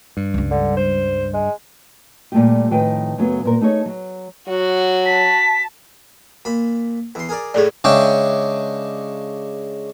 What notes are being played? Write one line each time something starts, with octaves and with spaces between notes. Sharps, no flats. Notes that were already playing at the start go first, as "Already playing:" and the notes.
G2
C#2 G3
D3
C5
G#3
A#2 G3 A3 F4 G4
F2 A2 D#3 B4 G5 G#5
F#2 C#3 F#3 A3 B3
G2 A#2 A#4
A3 D#4 G#4 C#5
F#3
F#3 F#4
A5 B6
A#2 B5
E2 C6
G#4 A#4 D5
A2 G#4 A4 C#5 D5
C#3 G#3 C#4 D4 E5 G5